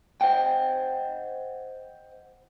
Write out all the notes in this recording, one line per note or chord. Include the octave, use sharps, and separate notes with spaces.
C5 D#5 F#5 G5